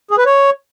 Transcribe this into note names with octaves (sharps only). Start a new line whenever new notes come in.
G#4
B4
C#5